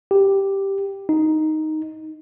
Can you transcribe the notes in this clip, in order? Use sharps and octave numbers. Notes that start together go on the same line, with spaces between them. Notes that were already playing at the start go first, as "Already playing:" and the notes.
G4
D#4